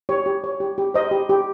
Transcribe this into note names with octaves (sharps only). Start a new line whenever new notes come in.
G4 C#5
G4
C#5
G4
G4
C5 D#5
G4
G4